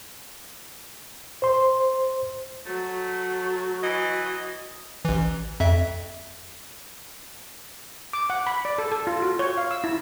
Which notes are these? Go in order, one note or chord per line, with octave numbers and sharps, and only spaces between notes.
C5 C6
F#3 A3
E3 D#5
A1 E3
F2 E5
D6
F#5
B5
D5
A4
A4
F4
F#4
C#5
F5
E6
E4